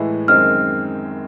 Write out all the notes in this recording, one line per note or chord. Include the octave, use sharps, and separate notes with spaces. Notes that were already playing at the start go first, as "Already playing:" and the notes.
Already playing: A2 E3 G#3
F#2 D#3 G#3 C4 F6